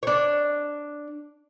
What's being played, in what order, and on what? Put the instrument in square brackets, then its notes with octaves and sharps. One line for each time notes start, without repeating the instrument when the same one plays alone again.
[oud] D4 C#5